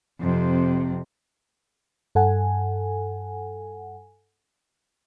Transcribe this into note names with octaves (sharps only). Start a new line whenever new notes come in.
F2 C3
G2 A4 F#5 G#5